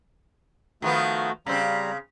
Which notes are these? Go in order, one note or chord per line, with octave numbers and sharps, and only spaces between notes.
D#3 F3 A3 B3 F#4
C#3 G3 C4 A#5